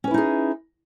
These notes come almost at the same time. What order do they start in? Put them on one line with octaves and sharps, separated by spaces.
C#4 B4 E4 D#4 G#4